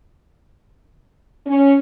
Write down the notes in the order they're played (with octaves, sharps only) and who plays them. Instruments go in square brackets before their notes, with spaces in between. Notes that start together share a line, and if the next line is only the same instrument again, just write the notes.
[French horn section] C#4